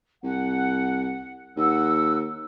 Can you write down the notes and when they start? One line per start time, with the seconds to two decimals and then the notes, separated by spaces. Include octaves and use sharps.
0.23 C2 F#5
1.56 D#2 F#5 E6